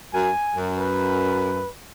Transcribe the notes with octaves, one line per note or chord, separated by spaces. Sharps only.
F#2 G#5
F#2
B4